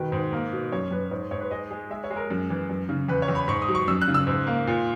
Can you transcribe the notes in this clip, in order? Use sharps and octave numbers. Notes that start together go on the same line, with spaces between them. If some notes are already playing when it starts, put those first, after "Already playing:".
Already playing: B2 D#3 B4
G#2
A#3
B2
F#2 C#5
F#2 B4
G#2 C#5
G#2 C#5
B4
G#3 D#5
G#3
G#3 E5
C#5
G#3
A#4
F#2
E3
F#2
C#3
E2 B4
C#5
E2
B5
G#2 C#6
D#6
F#3
C#6
F#2 E6
F#6
C#3
E6
G#2
A#3
A#2